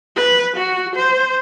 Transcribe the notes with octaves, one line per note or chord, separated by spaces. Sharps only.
B4
F#4
C5